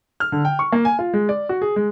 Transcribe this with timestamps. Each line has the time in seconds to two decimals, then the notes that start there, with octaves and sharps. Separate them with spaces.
0.20 F6
0.32 D3
0.45 G5
0.59 C#6
0.72 A#3
0.85 G#5
0.99 F4
1.14 G#3
1.29 D5
1.49 F#4
1.62 G#4
1.76 G#3